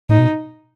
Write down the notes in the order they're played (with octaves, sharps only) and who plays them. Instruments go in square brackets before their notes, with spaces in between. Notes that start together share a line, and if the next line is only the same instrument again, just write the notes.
[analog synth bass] A2 [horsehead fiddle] D#4
[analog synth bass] B2